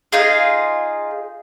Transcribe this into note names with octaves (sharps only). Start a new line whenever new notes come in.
D#4 F4 G#4